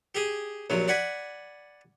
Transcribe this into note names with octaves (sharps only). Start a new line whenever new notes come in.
G4 G#4
A#1 C3 F#3
D5 F#5 G#5 B5